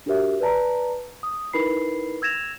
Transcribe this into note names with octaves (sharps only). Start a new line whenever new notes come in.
D4 F#4 G4 A#4 C#5 E5
B4 D5 A5 A#5
D#6
D#4 E4 A#4 B4 B5 C7
E6 G#6 A#6 E7 F7